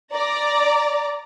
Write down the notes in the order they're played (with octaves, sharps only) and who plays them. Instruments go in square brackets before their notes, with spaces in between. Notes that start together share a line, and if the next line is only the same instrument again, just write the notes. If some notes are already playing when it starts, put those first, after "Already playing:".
[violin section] D5 A#5